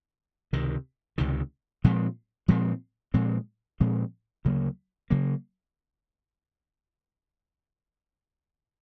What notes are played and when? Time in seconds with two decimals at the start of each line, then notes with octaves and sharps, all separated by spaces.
0.53 C#2 C3 D#3
1.18 C#2 C3 D#3
1.84 A#2 F3 G#3 C4
2.48 A#2 F3 G#3 C4
3.14 A#2 F3 G#3 C4
3.80 A#2 F3 G#3 C4
4.45 D2 C#3 F#3 A#3
5.10 C#3 F#3 A#3